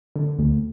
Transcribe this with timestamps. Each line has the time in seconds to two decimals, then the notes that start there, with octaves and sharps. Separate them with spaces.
0.16 D3
0.39 D2